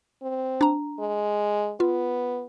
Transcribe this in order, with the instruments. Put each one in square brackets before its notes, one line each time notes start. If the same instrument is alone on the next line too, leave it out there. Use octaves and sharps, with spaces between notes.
[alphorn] C4
[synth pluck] D4 A#5
[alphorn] G#3
[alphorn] B3 [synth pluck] F4